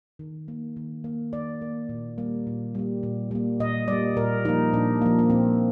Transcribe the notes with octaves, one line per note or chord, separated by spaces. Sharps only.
D#3
A#3
D#3
A#3
D#3 D5
A#3
A#2
G3 A#3
A#2
G3 A#3
A#2
G3 A#3
A#2 D#5
G3 A#3 D5
A#2 A#4
F3 A#3 D#4
A#2 D4
F3 A#3
A#3
A#2 C4